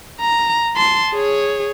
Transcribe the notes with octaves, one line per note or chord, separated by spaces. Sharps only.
A#5
A5 C6
G#4 C#5